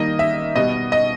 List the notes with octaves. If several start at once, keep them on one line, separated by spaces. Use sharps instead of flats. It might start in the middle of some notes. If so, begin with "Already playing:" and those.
Already playing: D#3 G3 A#3 D#5
E5
B2 G3 B3 D#5
D#5